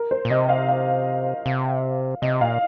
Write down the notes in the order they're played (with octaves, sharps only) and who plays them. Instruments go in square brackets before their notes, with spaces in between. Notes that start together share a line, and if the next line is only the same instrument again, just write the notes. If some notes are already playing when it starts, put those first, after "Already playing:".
Already playing: [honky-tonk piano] A#4
C5
[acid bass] A#2
[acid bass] C3 [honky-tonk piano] D#5
[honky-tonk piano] F5
F5
[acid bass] C3
[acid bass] C3 [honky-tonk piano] D#5
[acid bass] A#2 [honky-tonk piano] F5